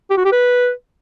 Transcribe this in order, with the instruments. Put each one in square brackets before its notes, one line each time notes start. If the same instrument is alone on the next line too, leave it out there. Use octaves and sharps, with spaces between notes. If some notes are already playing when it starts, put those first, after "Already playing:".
[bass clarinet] G4
F#4
G4
B4